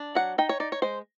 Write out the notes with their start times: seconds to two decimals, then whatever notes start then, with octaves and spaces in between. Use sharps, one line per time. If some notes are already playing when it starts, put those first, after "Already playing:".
Already playing: D4
0.15 F#3 F#5
0.38 D#4 G5
0.49 C#5
0.60 D#4 D5
0.72 C#5
0.82 G#3 C5